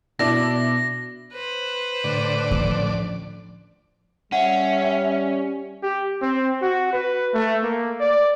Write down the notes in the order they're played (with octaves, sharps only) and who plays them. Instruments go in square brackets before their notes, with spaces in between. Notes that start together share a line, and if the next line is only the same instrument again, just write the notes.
[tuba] B2 [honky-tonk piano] D4 E4 [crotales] A#6
[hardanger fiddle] B4 C5
[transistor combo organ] A2 D3 D5
[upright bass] F3 C#4
[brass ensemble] G3 [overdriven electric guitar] C#4 [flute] E5 [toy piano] F#5
[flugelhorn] G4
C4
F#4
B4
A3
A#3
D5